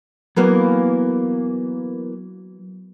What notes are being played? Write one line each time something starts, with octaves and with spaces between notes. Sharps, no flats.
E3 F#3 A#3 B3